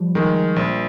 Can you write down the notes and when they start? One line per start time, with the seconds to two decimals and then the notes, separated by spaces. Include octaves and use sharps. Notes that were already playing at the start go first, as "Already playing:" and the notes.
Already playing: F3 G3
0.15 D#3 G#3
0.56 A#1